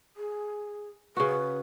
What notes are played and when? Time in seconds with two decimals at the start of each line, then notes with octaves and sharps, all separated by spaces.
0.17 G#4
1.17 C#3 F#4 B4